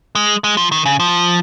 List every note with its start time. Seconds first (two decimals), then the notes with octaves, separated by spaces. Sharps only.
0.15 G#3
0.44 G#3
0.57 F3
0.72 D#3
0.85 C#3
1.00 F3